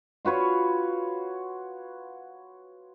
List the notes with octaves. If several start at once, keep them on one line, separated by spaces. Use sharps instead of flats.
F4 F#4 B4 C#5